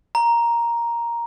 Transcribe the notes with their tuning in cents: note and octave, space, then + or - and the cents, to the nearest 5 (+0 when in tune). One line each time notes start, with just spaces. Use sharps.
A#5 +5